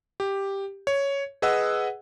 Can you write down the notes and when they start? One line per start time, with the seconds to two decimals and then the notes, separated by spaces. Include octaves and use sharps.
0.20 G4
0.87 C#5
1.42 G#4 B4 D#5 F#5 E6